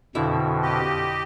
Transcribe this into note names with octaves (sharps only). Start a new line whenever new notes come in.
F2 B2 D3 E4 E5
G4 D#5